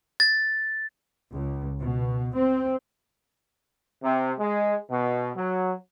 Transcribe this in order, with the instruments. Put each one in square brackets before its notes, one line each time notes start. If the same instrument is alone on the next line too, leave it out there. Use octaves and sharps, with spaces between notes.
[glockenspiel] A6
[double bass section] C#2
B2
C4
[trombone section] C3
G#3
B2
F#3